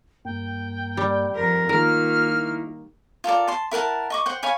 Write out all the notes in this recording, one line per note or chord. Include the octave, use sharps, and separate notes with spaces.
G2 A#3 G5
G3
F2 A#4
D#3 A#3 F4 A#4 F6
E4
F4 A4 A#4 D5
A5 C6
E4 A#4 F#5 A5
D#5 C#6 D6
C5 F#5 G5
C#5 F5 G#5 B5